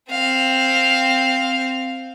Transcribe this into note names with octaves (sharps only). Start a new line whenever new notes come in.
C4 F5